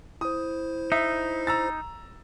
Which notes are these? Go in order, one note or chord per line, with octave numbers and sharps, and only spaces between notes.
E4 C5 D#6
D#4 E5
A#5 E6 A6